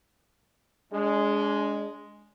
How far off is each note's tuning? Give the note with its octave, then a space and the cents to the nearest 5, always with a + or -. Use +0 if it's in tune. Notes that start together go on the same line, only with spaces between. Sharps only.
G#3 +0 D4 -35